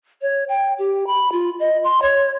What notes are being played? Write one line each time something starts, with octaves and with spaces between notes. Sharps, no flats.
C#5
G5
G4
B5
F4
D#5
C6
C#5